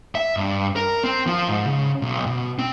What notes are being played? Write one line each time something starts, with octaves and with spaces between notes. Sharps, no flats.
E5
G2
A#4
C4
F3
G#2
C#3
B1
B2
C4